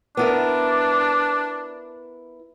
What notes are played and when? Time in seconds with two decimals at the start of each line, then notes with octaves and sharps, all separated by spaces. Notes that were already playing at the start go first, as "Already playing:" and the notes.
0.17 B3 D4 E4 A#4